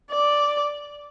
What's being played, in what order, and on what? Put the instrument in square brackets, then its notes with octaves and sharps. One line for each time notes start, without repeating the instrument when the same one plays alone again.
[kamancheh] D5